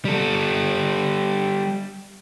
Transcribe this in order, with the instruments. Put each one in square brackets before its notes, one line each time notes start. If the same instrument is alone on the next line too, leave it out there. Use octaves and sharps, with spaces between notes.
[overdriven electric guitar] G3 A4